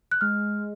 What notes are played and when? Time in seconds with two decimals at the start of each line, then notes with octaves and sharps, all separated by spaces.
0.11 F#6
0.21 G#3 F6